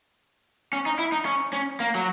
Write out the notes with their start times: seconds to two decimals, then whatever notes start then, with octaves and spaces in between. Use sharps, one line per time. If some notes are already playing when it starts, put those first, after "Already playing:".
0.73 C#4
0.86 D#4
0.99 E4
1.12 D#4
1.25 C#4
1.53 C#4
1.80 A#3
1.95 F#3